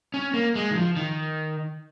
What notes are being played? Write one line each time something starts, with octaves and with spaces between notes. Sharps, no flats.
C#4
A#3
G#3
D#3
F3
D#3